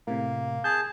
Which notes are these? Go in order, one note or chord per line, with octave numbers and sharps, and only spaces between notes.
A2 C3 A#3
G#4 A5 G6